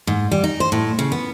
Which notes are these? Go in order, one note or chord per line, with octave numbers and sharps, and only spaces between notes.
G#2
G3
D#4
C5
A2
C#3
B3